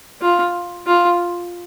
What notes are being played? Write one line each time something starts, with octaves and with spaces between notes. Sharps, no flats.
F4
F4